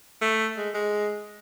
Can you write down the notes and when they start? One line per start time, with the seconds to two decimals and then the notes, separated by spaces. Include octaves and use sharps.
0.22 A3
0.57 G#3
0.74 G#3